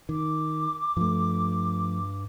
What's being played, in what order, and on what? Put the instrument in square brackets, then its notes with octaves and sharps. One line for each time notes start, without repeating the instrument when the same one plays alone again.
[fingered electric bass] D#3 [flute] D6
[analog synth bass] G2 [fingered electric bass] F3 A3